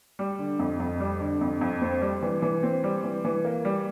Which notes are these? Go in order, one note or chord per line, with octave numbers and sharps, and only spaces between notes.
G3
D3
F2
F2
G3
D3
F2
F2
C4
G3
E3
E3
C4
G3
E3
E3
A#3
G3